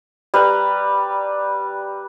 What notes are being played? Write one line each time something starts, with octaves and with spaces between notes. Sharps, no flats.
G3 B4 A#5